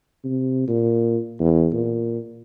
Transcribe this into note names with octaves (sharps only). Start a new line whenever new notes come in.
C3
A#2
E2
A#2